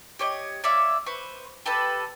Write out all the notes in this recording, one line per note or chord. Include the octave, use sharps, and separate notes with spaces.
G4 C#5 D#5
C#5 D5 E5 F5
B4 C5 C#6
G4 A4 B4 A5